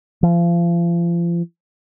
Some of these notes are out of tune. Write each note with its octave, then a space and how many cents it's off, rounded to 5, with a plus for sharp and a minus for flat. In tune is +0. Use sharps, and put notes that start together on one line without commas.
F3 -35